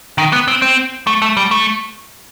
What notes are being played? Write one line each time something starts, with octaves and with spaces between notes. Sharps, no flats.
D#3
B3
C4
C4
A3
A3
G3
A3